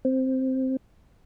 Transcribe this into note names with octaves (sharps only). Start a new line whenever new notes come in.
C4